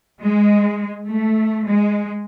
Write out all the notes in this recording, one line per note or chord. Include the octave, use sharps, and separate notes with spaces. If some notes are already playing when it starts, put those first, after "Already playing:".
G#3
A3
G#3